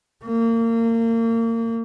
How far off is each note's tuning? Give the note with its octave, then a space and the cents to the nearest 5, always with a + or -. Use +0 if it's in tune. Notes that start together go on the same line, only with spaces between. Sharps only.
A#3 -30